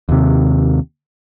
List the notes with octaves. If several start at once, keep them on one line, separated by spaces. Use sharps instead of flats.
D#2 C3